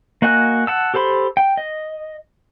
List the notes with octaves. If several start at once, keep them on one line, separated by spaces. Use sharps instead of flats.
A#3 F#4 D#5 G#5 F#6
F#5 A5 E6
G4 A4 C5 B5 C6
G5
D#5